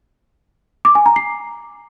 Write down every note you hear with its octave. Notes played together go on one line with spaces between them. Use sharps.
D6
G#5
A#5
C7